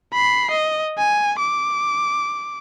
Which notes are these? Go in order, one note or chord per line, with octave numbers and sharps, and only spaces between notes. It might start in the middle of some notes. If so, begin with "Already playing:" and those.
B5 C7
D#5
G#5
D6